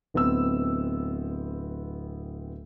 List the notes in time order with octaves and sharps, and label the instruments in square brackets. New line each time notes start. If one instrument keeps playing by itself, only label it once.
[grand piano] D1 B3 C4 E6